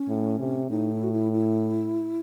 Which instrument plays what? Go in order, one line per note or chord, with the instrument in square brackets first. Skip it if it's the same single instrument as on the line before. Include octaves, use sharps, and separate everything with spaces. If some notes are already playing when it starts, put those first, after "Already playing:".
Already playing: [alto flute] C#4
[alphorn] A2
C3
[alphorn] A2 [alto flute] D#4
[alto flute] E4
F#4
E4
E4